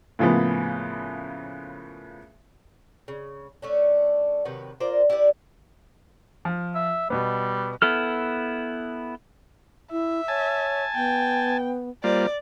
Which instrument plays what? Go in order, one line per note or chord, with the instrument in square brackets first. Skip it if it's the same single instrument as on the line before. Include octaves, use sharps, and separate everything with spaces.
[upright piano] A2 C#3 F3 A#3 B3
[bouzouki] C#3
A3 C#4 D4
C3 D#3 F#3 B4
F4 A#4 C5 D5
E4 G4 B4 D5
[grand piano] F3
[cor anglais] E5
[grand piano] B2 B3 [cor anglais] G3
[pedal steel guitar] B3 E4 A4 F6
[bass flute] E4 [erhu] E5
[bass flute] C#5 [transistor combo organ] G#5 A5
[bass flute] B3 [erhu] G5
[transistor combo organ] G3 A#3 F4 [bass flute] C5 [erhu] D5